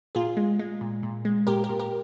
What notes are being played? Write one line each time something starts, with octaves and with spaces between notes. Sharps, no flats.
A#2 F4 G#4
G#3
G#3
A#2
A#2
G#3
A#2 G4 A#4
G4 A#4
A#2
G4 A#4